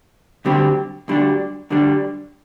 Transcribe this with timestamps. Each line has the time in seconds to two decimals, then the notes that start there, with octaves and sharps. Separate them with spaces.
0.45 D2 D3 G3 C4 G4
1.08 D2 D3 G3 D4
1.70 D2 D3 G3 D4